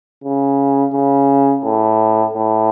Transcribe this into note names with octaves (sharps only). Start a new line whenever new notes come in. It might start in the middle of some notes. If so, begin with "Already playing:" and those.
C#3
C#3
A2
A2